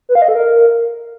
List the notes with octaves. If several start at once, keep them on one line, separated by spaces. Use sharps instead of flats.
B4
F5
D#5
A4
A#4